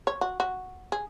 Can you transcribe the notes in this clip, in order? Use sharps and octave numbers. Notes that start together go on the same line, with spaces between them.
C#5
F#4
F#4
G#4